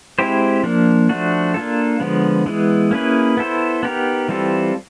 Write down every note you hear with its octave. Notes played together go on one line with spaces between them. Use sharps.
G#3 C4 E4 G4 C5
F3 A#3 D4
F3 A3 D4 F#4
A#3 D4 F4 A4
D3 F3 G#3 B3
E3 G#3 B3
A#3 C#4 E4 G#4 B4
B3 E4 A4 C5
B3 D#4 G4 A#4
E3 G3 C4 F4 A4